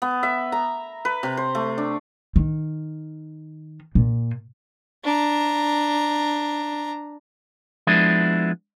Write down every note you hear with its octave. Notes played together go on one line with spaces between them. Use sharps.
B3
E5
A#5
B4
C3
C5
A3
D4
D#3
A#2
D4 A#5
F3 G#3 B3 D4 E4